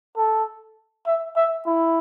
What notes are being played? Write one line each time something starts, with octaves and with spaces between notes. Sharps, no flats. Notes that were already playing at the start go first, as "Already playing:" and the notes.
A4
E5
E5
E4